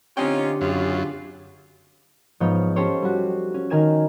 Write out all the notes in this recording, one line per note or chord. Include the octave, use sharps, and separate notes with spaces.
D3 C4 C#4 D#4 F4 G4 G5
F#2 C#3 F4
G#2 F3 B3 C#5 F6 G6
C#4 G4 A4 C5 C#5
G3 F#4
C#4
D#3 A#4 G#5 G#6 E7